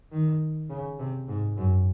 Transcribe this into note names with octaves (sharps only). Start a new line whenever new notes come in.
D#3
C#3
C3
G#2
F#2